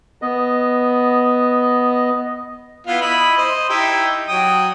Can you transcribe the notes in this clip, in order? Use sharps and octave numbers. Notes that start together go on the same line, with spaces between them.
B3 D#5
B3 E4 F4
E4 D#5 B5
C5 D#5
D#4 E4 G4
F#3 G5 D#6